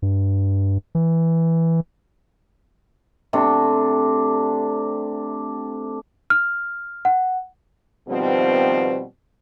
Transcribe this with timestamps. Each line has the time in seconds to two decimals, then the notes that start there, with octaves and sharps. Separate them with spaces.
0.02 G2
0.95 E3
3.33 C3 A3 D4
6.30 F6
7.05 F#5
8.09 B2 D#3 F3 G3 B3 C4